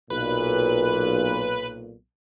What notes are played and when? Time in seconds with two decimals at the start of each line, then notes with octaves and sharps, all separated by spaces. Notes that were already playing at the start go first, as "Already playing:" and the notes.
0.10 B1 A#2 B4